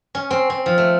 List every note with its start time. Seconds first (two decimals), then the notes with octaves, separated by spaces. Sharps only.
0.15 C#4
0.30 C4
0.50 C4
0.66 F3
0.78 A3